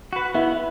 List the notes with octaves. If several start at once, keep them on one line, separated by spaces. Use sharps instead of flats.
F#4 B4
B3 E4